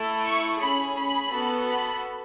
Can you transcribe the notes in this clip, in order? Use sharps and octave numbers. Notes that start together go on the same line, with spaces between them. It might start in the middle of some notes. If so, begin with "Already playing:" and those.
Already playing: A3 E4 A4
C#6
C#4 G#4 B5
B5
B3 F#4 A4
B5